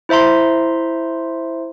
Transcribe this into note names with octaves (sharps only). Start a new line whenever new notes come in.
E4 C5 E5 A#5 C6